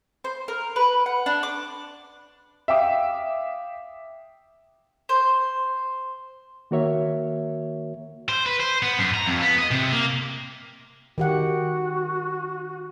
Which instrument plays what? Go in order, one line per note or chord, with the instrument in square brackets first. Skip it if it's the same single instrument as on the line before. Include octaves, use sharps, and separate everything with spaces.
[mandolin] C5
A#4
B4
F#5
D4
D6
[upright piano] E5 F5 G5 D6 D#6
[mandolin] C5
[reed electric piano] D#3 A#3 F#4 A#4 C#5 E5
[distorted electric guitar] C5
B4
C5
B3
F#2
A#5
F2
B3
D#5
C3
A#3
[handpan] D#3 G4 F#5 [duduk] F#4